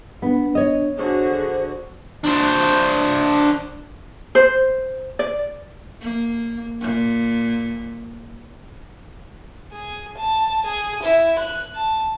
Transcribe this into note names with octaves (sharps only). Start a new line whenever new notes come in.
B3 D4
C#5 D#5
D3 F#4 G#4 C5
D4 C5
C5
D5
A#3
A#2
G#4
A5
G#4
E4
F#6
A5